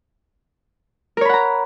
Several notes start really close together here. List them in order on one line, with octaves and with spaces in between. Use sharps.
A#4 C#5 B5 F#5 A#5